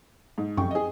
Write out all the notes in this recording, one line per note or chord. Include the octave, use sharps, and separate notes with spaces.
G#2
F1 F#2 G5 C#6
G#4 D#5